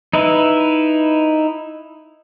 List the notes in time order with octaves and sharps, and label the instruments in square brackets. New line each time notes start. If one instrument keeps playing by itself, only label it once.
[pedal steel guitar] D#4 E4 B4 E5